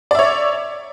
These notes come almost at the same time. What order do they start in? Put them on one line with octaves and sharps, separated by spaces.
D5 E5 C#5